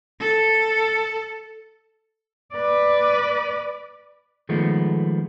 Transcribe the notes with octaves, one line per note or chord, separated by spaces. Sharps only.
A4
B4 D5
D#3 F3 G#3 A3 B3